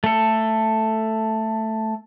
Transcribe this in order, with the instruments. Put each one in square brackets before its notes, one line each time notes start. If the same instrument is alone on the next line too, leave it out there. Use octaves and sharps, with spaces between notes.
[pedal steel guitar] A3 A4